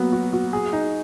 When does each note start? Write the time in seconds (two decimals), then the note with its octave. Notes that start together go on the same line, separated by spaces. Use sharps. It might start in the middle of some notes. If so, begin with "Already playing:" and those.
Already playing: F#3 A#3 B3
0.12 F#4
0.33 F#4
0.53 G#4
0.73 D#4